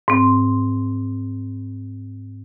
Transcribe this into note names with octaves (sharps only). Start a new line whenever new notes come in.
G#2 C4